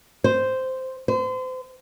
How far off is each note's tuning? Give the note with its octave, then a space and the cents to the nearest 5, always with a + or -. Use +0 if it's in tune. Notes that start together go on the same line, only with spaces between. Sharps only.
C5 -5
C5 -35